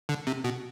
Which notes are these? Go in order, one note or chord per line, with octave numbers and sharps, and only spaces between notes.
D3
C3
B2